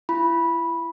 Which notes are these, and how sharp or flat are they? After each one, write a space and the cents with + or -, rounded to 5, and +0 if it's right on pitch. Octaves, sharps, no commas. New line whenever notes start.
E4 +40 B5 -10